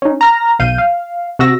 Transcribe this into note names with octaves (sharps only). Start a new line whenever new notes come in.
C#4 D#4
A#5 F6 A#6
B1 F5 G6 D#7
F5
C3 F#4 E6 A#6